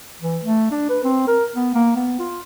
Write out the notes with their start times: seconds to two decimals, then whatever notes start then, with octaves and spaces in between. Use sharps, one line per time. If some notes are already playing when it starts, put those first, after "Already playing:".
0.22 E3
0.44 A3
0.71 D4
0.90 B4
1.04 C4
1.27 A#4
1.56 B3
1.75 A#3
1.96 B3
2.19 F4